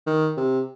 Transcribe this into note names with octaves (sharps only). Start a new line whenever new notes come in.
D#3
C3